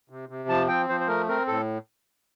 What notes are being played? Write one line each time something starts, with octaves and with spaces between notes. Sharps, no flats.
C3
C3
F3 A5
C4 G5
F3 C5
C5
A3 A#4
C4 A#4
A2 A4